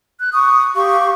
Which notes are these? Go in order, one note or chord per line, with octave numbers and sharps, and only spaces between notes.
F#6
C#6 D#6
G4 F5 C#6